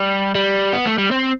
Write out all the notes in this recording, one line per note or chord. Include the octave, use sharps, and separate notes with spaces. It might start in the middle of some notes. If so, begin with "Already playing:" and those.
Already playing: G3
G3
B3
A3
G3
C4